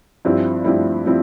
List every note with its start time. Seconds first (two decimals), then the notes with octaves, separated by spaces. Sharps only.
0.25 G2 F3 C4 E4
0.64 G2 F3 C4 E4
1.06 F3 C4 E4